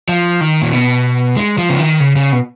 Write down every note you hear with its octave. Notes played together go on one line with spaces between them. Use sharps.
F3
D#3
A#2
B2
G#3
F3
C#3
D#3
C#3
C#3
B2